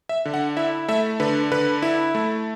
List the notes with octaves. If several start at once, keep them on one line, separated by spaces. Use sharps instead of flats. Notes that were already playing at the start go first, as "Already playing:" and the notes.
E5
D3
F#5
E4 E5
A3 E5
D3 B4
D3 B4
E4
A3